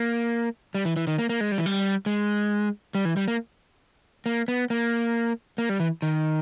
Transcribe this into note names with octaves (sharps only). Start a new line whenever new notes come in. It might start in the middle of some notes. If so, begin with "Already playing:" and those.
Already playing: A#3
G3
E3
E3
D#3
A#3
A#3
G#3
G3
E3
G3
G#3
G3
E3
G3
A#3
A#3
B3
A#3
A#3
G3
E3
D#3